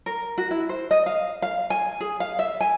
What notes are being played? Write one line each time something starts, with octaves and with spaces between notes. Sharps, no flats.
A#4
F#4
E4
C5
D#5
F5
F5
G#5
G#4
F5
E5
G#5